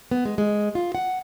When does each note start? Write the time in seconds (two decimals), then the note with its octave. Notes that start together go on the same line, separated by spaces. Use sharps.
0.11 B3
0.25 G#3
0.38 G#3
0.75 F4
0.95 F#5